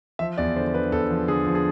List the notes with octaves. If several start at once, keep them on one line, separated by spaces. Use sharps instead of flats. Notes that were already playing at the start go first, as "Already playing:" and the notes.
F3 E5
E2 D5
D3 C5
D3 B4
E2 A4
F3
D3 G#4
F3
G#4